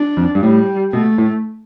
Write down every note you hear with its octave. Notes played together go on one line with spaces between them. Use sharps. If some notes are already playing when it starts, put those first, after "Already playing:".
Already playing: D4
F2
G2
A2 G3
B2 A3
A2